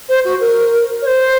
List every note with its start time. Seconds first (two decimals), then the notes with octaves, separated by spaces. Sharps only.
0.08 C5
0.24 F#4
0.40 A#4
1.02 C#5
1.06 C5